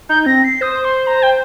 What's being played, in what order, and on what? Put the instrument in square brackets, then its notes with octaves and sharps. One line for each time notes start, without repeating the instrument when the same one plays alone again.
[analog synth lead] D#4 [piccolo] G6
[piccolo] G6
[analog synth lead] C4 [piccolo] A#6
[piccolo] C7
[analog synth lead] C5 [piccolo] D#6
[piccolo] C6
A#5
G5